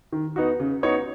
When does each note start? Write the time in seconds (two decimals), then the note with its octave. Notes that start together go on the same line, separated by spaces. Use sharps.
0.12 D#3
0.36 B3 D#4 F#4
0.60 C#3
0.83 B3 D#4 F#4 C#5